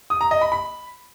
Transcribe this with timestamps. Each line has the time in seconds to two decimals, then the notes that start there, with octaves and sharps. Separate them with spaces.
0.10 D#6
0.21 A#5
0.31 D#5
0.41 B5
0.52 B5